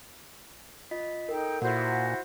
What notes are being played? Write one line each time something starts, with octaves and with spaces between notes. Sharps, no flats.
F4 D#5 B6
D#4 A4 A#4 G5
A#2 E4 F#4 C5 F#5